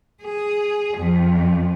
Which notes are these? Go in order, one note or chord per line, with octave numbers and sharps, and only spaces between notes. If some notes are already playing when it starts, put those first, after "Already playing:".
G#4
F2